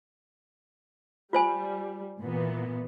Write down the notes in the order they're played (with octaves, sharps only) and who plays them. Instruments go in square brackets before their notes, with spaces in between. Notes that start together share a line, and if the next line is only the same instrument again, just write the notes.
[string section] G3 [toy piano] F4 C5 G#5
[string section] A#2 E3 B3